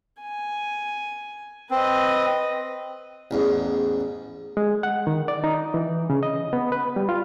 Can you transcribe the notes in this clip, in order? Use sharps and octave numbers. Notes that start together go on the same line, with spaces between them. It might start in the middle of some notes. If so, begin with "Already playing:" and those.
G#5
C4 B4 D#5
A1 E2 G#2
G#3
F#5
D#3
D5
D#4
E3
C#3
D#5
B3
B4
G3
F4